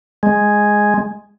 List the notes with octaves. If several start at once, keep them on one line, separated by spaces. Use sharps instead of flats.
G#3